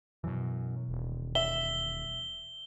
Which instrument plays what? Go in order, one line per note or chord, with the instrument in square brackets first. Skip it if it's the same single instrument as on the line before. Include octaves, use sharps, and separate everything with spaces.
[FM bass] F#2 [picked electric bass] B2 E3
[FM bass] D#1
[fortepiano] E5 [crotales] G7